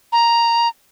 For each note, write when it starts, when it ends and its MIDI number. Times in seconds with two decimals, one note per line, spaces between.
0.12 0.68 82